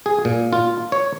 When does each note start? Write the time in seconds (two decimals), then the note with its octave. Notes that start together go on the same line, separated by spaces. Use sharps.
0.06 G#4
0.25 A#2
0.53 F4
0.92 C#5